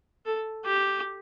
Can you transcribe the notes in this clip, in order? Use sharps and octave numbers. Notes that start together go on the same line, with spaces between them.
A4
G4